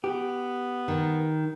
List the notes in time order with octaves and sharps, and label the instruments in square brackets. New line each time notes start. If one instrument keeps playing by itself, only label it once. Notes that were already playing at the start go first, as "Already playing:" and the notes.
[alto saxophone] B3 [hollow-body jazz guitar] G4
[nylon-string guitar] D#3